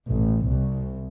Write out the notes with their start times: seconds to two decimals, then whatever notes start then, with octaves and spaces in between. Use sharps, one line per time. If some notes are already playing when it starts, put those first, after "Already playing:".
0.10 A1
0.49 C2